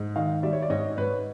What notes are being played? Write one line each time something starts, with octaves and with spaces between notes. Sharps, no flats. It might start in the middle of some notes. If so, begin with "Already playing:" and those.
Already playing: G#2
D#3 D#5 F5
G3 D5 E5
C#5
D5
G#2 C#5 D#5
G#2 B4 C#5